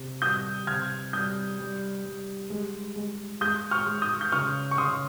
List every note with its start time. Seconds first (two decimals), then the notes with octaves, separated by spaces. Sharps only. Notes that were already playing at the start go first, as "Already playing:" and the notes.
Already playing: C3
0.22 G3 D#6 G6
0.67 C3 F6 G#6
1.13 G3 D#6 G6
1.59 G3
2.04 G3
2.50 G#3
2.96 G#3
3.41 G#3 D#6 G6
3.71 C#6 F6
3.87 G#3
4.02 D#6 G6
4.21 G6
4.32 C#3 C#6 F6
4.71 C#6
4.78 C#3 C6 D#6